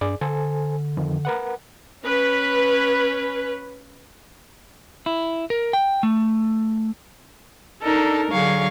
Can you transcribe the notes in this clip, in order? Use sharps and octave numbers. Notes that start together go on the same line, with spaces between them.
G2 G#4 D5
D3 A4 C5 G#5
F2 D#3 F3
A#4 B4 F#5
C#4 B4
E4
A#4
G5
A3
D4 D#4 A4 A#4
D3 F#3 G#4 F5 C#6